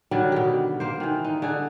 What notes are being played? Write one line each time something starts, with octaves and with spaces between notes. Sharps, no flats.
D3 D#3 F#3 G3
B2 G4
A#3 C5
D#3 E3
D#4
D3 G#4